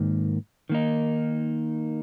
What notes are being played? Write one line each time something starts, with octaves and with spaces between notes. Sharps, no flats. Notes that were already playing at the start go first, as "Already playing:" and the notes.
Already playing: G#2 D#3 A#3
D#3 A#3 D#4